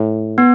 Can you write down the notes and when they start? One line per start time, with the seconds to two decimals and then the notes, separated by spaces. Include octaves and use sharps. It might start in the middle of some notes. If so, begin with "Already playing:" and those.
Already playing: A2
0.38 B3